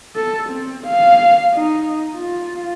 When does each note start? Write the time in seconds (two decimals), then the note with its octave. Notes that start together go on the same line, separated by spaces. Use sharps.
0.16 A4
0.50 C4
0.87 F5
1.54 D#4
2.17 F4